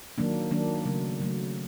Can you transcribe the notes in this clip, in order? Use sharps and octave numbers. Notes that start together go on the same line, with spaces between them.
D#3 F#3 A#3 D4
D#3 F#3 A#3 D4
C#3 F#3 A3
C#3 F#3 A3